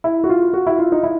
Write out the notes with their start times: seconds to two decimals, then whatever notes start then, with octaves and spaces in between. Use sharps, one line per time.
0.04 E4
0.24 F#4
0.29 F4
0.53 F#4
0.67 E4
0.79 F4
0.92 D#4
1.03 E4